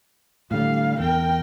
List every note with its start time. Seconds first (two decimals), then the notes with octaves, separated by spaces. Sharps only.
0.51 A2 D3 G3 F5
0.99 E2 A#4 G5